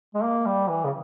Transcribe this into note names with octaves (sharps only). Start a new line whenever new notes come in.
G#3
A#3
G3
E3
C#3